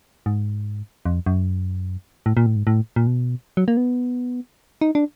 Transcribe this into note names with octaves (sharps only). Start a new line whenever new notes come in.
G#2
F2
F#2
A2
A#2
A2
G#2
A2
A#2
B2
F#3
A#3
B3
D#4
D4